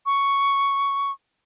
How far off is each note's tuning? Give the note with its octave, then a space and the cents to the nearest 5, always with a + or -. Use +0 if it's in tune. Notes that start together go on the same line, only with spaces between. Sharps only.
C#6 +5